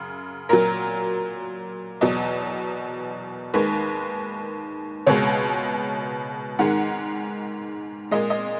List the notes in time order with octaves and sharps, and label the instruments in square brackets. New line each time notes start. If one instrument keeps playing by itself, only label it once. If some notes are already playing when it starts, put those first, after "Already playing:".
Already playing: [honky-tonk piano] F#2 C#3
A#2 F#3 A#4
E2 B2 F#3 D#5
D#2 D#3 G#3 B4
C#2 B2 G#3 C#5
G#2 D#3 G#3 F#5
A#2 G#3 D#5
D#5